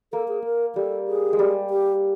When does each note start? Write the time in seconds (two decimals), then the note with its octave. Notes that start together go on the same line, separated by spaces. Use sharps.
0.12 A#3 A4
0.28 G#4
0.44 A#4
0.75 G3 A4
1.08 G#4
1.33 G#3
1.39 G3
1.70 G4